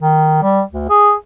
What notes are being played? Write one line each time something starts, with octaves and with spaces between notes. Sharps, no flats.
D#3
G3
D2
G#4